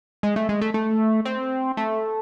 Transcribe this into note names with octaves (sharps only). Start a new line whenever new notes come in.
G#3
A3
G#3
A3
A3
C4
A3